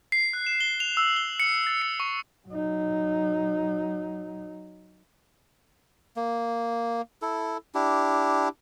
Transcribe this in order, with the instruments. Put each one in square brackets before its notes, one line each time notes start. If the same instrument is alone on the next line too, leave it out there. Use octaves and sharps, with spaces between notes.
[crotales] C7
F#6
E7
G7
F7
E6
G7
C#7
A6
C#7
C#6
[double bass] F#3 D#4
[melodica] A#3
E4 A4
D4 E4 G4